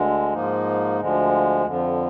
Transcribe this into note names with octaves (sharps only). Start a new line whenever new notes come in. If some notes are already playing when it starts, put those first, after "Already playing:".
Already playing: D2 D3 G#3
G#2 F3 A#3 D#4
D2 D3 F3 G#3
F2 D3 F3